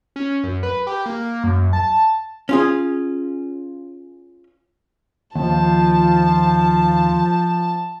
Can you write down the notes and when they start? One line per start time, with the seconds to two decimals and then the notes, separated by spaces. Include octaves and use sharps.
0.16 C#4
0.44 F#2
0.63 B4
0.87 G4
1.06 A#3
1.44 F#2
1.73 A5
2.49 C#4 F4 G#4
5.35 D#2 F3 A5